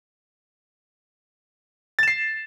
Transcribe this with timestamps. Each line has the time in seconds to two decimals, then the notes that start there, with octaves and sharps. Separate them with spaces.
1.99 A6
2.03 E7
2.08 C7